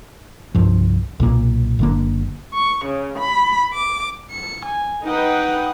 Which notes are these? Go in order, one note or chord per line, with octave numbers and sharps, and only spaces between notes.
C2 G2 F3
B1 A#2 A#3
F#1 D3 A#3
C#6
C#3
B5
D6
C#7
G#5
D#4 B4 F#5 G5 D#6